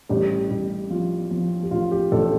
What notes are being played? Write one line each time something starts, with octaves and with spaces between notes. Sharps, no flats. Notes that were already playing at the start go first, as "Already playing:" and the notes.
A1 G3
A1 G3
F3 F4
F3
G4
A1 F4
G4
A1 A4